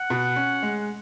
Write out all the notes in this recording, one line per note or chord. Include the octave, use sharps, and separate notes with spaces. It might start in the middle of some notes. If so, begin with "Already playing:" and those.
Already playing: F#5
B2
C#4
G#3